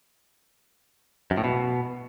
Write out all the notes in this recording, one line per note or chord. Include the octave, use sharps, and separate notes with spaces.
F#2
A2
B2